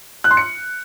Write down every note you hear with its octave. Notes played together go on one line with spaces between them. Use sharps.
F#6
C6
C#7